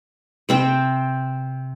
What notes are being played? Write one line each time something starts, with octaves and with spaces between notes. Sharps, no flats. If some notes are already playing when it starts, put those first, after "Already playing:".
C3 C4 G5